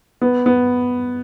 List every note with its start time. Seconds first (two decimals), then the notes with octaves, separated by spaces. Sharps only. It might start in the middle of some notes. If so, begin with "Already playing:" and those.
0.21 B3
0.46 B3